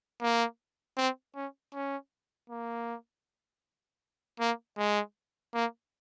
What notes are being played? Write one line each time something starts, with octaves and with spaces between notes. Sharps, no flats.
A#3
C4
C#4
C#4
A#3
A#3
G#3
A#3